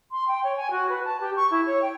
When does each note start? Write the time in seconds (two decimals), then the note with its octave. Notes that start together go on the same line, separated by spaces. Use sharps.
0.11 C6
0.27 G5
0.44 C#5
0.56 G#5
0.71 F#4
0.89 B4
1.05 A5
1.20 G4
1.36 C#6
1.51 E4
1.66 C#5
1.82 G5